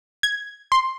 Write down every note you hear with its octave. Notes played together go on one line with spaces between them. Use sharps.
G#6
C6